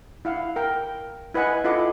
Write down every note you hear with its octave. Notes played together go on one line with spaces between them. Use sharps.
E4 F5 F#5
A#4 G5
E4 B4 D#5 F#5 G#5
E4 F4 A4 D#5 F#5 D6